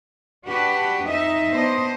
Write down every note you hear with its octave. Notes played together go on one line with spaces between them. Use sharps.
D4 F#4 G4 B4
F2 D#4 D#5 E5
B3 D4 C5 D#5